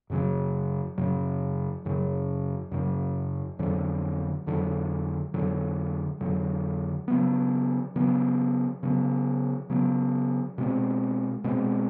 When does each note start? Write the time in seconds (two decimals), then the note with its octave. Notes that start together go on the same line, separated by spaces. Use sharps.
0.10 F#2 C#3 F#3
0.98 F#2 C#3 F#3
1.85 F#2 C#3 F#3
2.71 F#2 C#3 F#3
3.59 F2 D3 F#3
4.47 F2 D3 F#3
5.34 F2 D3 F#3
6.21 F2 D3 F#3
7.08 C#3 F#3 B3
7.96 C#3 F#3 B3
8.83 C#3 F#3 B3
9.70 C#3 F#3 B3
10.58 B2 G#3 C4
11.44 B2 G#3 C4